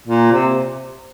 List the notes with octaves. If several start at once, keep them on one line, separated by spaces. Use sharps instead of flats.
A#2
C3